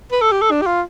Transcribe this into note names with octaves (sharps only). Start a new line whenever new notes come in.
B4
A4
G4
A4
D4
G4
F4